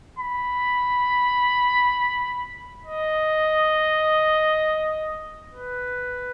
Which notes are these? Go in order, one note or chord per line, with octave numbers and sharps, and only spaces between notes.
B5
D#5
B4